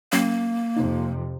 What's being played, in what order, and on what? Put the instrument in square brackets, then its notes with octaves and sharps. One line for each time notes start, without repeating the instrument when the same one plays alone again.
[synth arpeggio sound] F#3 C#4 G5 [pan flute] A#3
[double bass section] F2 C3 [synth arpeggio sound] D#4